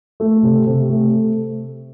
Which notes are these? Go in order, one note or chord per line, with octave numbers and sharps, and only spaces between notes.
A3
C3
C3
A3